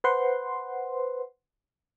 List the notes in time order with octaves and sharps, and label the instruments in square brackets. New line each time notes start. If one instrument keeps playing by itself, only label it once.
[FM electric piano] B4 C5 F#5 C6